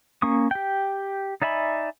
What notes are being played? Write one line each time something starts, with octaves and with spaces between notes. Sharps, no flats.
A#3 C#4 C#6 D#6
G4 G5
D#4 D5 E5 G#5 B5